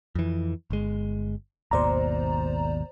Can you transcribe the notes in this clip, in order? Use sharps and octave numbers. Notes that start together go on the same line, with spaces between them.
F2 E3
G1 G#3
G#1 D#2 B2 C5 D5 A#5